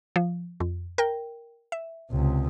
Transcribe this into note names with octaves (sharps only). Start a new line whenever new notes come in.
F3
F2
A#4 G5
E5
C#2 C3